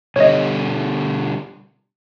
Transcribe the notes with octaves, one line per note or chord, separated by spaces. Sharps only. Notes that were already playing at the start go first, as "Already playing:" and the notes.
B2 D3 G3 C#5 D#5